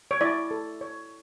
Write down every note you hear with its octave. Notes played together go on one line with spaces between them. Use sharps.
C#5
E4 D5
A4
C#5